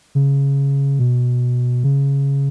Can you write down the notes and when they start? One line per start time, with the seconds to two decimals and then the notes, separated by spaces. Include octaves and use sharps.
0.15 C#3
0.99 B2
1.84 C#3